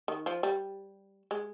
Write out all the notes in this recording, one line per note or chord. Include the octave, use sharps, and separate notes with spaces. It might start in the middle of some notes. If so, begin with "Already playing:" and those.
D#3
F3
G3
G#3